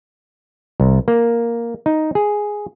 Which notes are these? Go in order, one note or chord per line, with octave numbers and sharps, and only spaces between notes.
C2
A#3
D#4
G#4